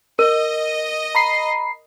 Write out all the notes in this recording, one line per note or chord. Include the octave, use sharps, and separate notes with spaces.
A#4 D#5
A#5 B5 C7